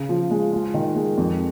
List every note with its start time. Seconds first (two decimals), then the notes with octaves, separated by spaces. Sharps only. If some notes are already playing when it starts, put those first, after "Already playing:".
Already playing: C#3
0.09 F3
0.31 G#3
0.53 F4
0.74 D#3
0.96 G#3
1.17 F2